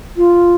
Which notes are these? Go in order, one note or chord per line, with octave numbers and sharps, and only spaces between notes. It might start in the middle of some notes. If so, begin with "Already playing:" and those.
F4